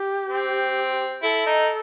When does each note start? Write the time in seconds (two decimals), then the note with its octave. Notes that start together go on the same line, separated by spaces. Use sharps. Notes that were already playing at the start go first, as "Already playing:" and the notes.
Already playing: G4
0.29 C4
1.22 E4 A4
1.46 D#4